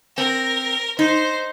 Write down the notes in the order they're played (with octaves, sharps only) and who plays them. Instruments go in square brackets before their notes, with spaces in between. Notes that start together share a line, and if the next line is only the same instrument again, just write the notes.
[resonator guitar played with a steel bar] C4 [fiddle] A#4
[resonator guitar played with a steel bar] D#4 [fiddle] C5